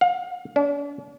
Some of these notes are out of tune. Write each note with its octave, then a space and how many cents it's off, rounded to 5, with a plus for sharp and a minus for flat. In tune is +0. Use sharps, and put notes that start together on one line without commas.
F5 +35
D4 -45